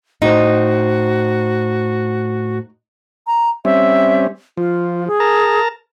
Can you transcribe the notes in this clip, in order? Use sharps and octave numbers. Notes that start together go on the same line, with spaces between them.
A2 D#4 F#4 C5
A#5
G3 C4 C#4 E5
F3 F4
G#4
A#4 A5 A#5